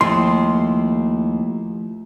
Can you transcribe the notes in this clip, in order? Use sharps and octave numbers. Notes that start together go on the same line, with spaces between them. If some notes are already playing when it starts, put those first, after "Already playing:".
D#2 F3 A3 E4 C6